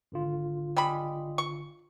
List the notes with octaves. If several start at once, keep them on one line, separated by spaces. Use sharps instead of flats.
G#1 D3 F4
G3 G#3 B5
C#6